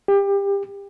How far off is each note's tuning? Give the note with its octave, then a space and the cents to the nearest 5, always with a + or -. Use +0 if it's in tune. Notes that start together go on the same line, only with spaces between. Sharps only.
G4 +25